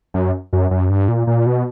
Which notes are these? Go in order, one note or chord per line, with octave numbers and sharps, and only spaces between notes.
F#2
F#2
F#2
G2
A#2
A#2
B2